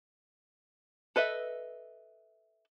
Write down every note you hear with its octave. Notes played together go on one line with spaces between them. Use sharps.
A4 B4 D#5 E5